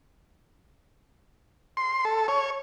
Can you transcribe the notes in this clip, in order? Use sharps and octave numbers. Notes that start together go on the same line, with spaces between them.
C6
A4
C#5